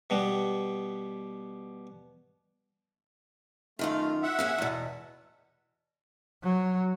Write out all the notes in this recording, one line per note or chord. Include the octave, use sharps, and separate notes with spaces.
B2 G3 B3
F#2 D#3 A3 F4
E5 F#5
A#3 C#4 G#4
E2 B2
F#3